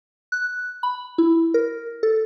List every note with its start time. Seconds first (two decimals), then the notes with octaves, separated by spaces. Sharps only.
0.32 F#6
0.83 B5
1.18 E4
1.54 A#4
2.03 A4